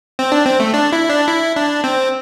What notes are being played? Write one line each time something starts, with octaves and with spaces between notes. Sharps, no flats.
C4
D4
C4
A3
D4
E4
D4
E4
D4
C4